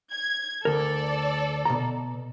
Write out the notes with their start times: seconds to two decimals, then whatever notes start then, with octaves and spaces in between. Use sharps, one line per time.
0.12 G#6
0.65 D2 A4 A#4 D5
1.65 B2 A#5